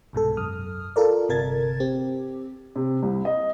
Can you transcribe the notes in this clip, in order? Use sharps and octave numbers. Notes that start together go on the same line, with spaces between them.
C2 G#2 B2 A4
F#2 D#6 F6
F4 A4 A#4 D5
G1 C3 A#4 A5 G#6 A6
C4 G4
C3
C2
D#5